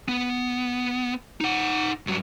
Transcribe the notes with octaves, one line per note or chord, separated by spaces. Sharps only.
B3
D#4 F#5
G2 F#3